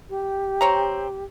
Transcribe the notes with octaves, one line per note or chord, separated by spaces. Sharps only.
G4
C4 C#5 A#5